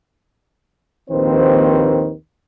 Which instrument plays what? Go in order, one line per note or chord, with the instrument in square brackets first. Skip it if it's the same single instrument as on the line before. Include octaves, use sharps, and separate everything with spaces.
[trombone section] A#1 D#2 D#3 C4 B4 C5